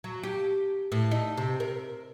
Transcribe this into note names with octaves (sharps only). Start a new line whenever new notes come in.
F#3
G4
A2
D#4
C3
A#4